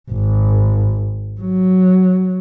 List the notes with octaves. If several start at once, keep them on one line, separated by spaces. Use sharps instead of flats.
G#1
F#3